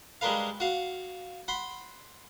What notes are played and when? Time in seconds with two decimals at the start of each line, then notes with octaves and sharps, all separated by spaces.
0.21 G3 G#3 D4 A#4 B4 F5
0.60 F#4 F5
1.48 F#5 B5 C6